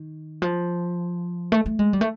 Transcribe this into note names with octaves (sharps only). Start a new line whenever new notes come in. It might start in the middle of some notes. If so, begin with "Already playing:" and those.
Already playing: D#3
F3
A3
A3
G#3
G3
A3